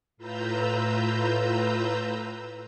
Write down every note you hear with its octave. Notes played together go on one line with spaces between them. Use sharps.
A2 F4 B4 A#5 E6 G6